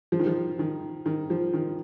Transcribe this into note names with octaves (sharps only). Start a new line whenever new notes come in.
F3
D#3
F3
D#3
D#3
F3
D#3